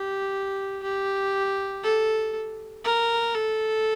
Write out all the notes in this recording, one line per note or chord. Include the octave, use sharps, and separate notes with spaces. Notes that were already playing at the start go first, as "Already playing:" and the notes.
Already playing: G4
G4
A4
A#4
A4